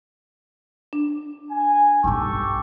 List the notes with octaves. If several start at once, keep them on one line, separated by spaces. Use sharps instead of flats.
D4
G#5
B1 G2 G4 A4 C#6